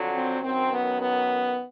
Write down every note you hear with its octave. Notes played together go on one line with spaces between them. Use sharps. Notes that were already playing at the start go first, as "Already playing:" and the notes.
Already playing: F2 D3 F#3
C4
F#2 D#3 F#3 C4
B3
B3